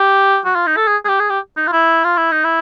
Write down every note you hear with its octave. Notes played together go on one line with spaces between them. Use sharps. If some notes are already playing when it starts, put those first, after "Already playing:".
Already playing: G4
F#4
F4
D#4
A4
G#4
G#4
G4
G#4
G4
D#4
F4
E4
F4
E4
D#4
E4